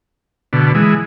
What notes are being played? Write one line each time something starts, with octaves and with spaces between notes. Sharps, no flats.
B2 D3
E3 G#3